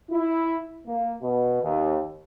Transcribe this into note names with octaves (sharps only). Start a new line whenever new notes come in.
E4
A#3
B2
D#2